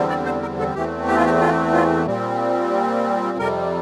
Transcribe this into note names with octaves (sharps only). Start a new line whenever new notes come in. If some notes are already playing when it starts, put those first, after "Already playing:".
Already playing: E2 D3 G3 C4
D5
C5
A#4
A4
E2 E3 A3 C4 G4
G4
F4
G4
F4
F4
A#2 G3 C4
F2 C3 G3 A#4